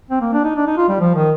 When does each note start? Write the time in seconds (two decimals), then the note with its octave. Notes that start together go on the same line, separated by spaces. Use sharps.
0.11 C4
0.21 A#3
0.33 D4
0.44 D#4
0.56 D4
0.67 D#4
0.77 F4
0.89 G3
1.00 F3
1.15 D#3